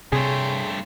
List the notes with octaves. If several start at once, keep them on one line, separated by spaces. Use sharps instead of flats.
G2 C3 A3 G#4 C#5 G5 C6